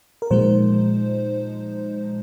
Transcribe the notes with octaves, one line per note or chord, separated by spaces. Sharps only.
A#4
A#2 F3 G#3 D#4 C5